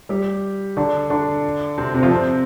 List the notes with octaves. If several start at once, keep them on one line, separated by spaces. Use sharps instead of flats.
G3 G4
D3 D4
D3 D4
C3 C4
C3 C4
F3 F4
C3 C4